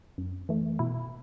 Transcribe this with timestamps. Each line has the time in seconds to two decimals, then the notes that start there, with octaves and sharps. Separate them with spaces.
0.18 F#2
0.49 E3 A3
0.79 B2 E4